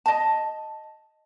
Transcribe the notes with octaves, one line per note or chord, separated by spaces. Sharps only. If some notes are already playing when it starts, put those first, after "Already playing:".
D#5 A5